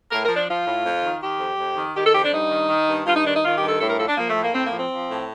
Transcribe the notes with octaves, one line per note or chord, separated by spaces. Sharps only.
A2 A#4
A#4
F3
D4
F3 F4
A2
F2
D#3
D#3 G4
F2
F2
D#3
D#3 G4
A4
F2 G4
D4
G2 D#4
D#3
D#3
G2
G2 F4
D#4
D#3 D4
D#4
D#3 F4
G4
G2
A4
A2 A4
A#4
F3 A4
D4
F3 A#3
A3
A2
A#3
A2 C4
A#3
F3
C4
F3
A2